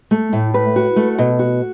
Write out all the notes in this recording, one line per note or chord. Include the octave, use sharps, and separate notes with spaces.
A3
A2
B4
F#4
A3
B2
F#4